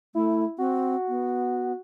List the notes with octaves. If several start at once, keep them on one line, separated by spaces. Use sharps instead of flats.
A3 E4
C4 F#4
B3